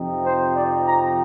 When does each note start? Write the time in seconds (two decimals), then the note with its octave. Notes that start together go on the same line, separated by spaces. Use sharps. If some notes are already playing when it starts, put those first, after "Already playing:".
Already playing: F2 C3 F3 C4 D#4
0.23 C5
0.53 D5
0.85 A#5